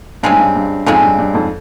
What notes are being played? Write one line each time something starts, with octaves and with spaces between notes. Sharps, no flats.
G2 C#3 F3 G#3 C4
G#2
G2
G2
F2 G#2 C#3 F3 G#3 C4
G2
G2
F2 G#2